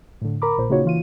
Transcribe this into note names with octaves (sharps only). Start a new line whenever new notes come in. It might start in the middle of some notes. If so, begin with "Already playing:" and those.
A2 D3
A#4 A#5 B5 D6
A#1 A#2 C5
C#3 A#3 D#4 F4 F#4 C#5
E3 F4 D#7